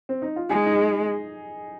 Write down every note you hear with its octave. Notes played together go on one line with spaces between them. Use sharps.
C4
D#4
F4
G#3 D#4 G#4
D#4